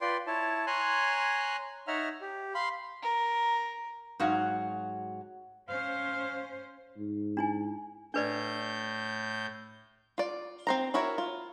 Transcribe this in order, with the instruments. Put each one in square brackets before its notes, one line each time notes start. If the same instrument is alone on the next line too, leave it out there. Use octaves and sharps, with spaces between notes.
[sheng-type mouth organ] F4 B4 D5 G5 C6
E4 C#5 A5
C#5 G#5 A#5 C6 F#6
D#4 C#5 E5 F#5 A#5 F6
G4
F5 B5 C6
[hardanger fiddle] A#4
[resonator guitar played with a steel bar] G#2 F#3 F#4 F5
[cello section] C#4 C5 [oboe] F5
[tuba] G#2
[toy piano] D4 E4 G#5
[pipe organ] A2 G6 [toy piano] D4 B4 D5
[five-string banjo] F4 D5
C4 C5 A#5
E4 F#4 A#4 C#5 E5
F4